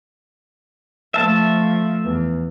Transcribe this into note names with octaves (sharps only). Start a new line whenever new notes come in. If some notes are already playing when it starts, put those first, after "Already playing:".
F3 A3 E5 A5
E2